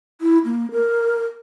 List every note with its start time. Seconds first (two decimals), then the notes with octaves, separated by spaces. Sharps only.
0.21 E4
0.45 A#3
0.72 A#4